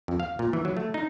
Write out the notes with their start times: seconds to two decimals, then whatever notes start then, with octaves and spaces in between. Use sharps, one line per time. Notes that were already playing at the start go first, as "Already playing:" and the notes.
0.08 F2
0.20 F5
0.39 A#2
0.53 E3
0.65 F#3
0.77 A3
0.94 D#4